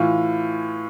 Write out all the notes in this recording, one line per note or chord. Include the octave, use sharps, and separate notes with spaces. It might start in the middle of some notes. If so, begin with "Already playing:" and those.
Already playing: A2 E3 F4